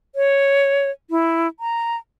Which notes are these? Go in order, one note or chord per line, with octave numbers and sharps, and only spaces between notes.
C#5
E4
A#5